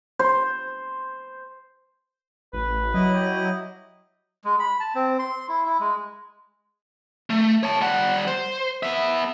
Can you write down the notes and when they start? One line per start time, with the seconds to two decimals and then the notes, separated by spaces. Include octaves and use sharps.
0.19 C5
2.53 A1 B4
2.94 F#3 E4 D#5
3.14 G4
4.44 G#3
4.59 B5
4.80 A5
4.95 C4
5.19 C6
5.49 E4
5.66 E4
5.80 G#3
7.30 A3
7.63 C#5 A5
7.81 G3 F#5
8.27 C5
8.83 B3 E5